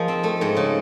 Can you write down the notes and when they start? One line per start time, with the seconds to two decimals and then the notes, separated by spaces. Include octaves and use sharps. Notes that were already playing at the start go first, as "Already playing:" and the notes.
Already playing: F3 A#3 D#4 G#4
0.08 C4
0.24 A3
0.41 G#2
0.57 C#3